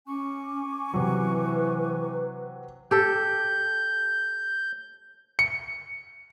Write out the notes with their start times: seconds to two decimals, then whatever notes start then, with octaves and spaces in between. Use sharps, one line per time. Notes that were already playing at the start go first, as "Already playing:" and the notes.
0.07 C#4 G#5 C#6 D6
0.94 C3 E3 F#3 B4
2.91 G4 A4 G6
5.39 C#7